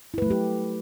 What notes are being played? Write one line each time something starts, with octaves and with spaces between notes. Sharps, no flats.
F#3 A3 E4 G4 B4